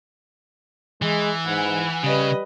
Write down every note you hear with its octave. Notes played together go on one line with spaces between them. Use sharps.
E3 G#3
G#2 F#5 G#5 B5
C#3 G3 B4 D#5 B5